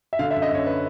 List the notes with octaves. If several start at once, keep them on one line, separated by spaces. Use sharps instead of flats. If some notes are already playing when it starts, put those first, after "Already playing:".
E5
D3 F5
E5
F#2
D#5
F#2 C#5
B4